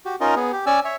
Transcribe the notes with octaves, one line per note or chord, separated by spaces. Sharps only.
F#4 G4
C#4 D#4 F4 A#4 D#5
B3 G#4
G4
C#4 D5 G#5 E6
C#5 E5